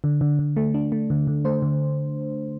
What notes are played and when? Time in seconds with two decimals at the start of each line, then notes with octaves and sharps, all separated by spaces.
0.04 D3
0.21 D3
0.39 D3
0.57 A3
0.74 D4
0.92 A3
1.10 D3
1.27 D3
1.45 A3 C5
1.62 D3